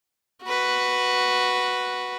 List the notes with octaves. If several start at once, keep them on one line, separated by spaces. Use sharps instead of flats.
F#4 B4